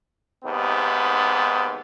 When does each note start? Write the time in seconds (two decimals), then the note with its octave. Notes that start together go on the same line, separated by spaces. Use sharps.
0.45 D#2 G#2 C3 B3